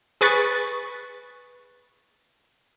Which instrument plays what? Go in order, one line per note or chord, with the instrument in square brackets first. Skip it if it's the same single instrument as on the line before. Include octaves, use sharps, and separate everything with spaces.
[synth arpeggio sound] G#4 B4 C#6 A6 B6